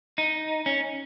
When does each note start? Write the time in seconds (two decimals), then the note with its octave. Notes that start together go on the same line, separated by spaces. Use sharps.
0.18 D#4
0.66 C#4